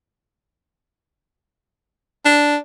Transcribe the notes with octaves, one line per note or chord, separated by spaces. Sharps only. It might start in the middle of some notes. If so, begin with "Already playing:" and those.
D4